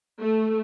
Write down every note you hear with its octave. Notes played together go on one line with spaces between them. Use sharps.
A3